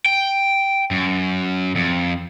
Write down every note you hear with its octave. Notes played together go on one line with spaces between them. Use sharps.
G5
F#2
F2